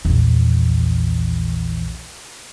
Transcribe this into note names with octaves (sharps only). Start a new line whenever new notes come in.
A#1 E2